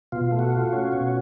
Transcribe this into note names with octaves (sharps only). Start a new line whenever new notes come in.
B2 F4
A3
F#4
F4
F#4
C#4
B2